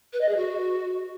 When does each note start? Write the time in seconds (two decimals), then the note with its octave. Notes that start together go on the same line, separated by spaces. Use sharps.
0.13 B4
0.21 D#5
0.29 G#4
0.36 F#4